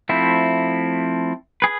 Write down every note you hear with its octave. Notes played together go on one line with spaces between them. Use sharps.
F3 A3 C4 E4
G#4 B4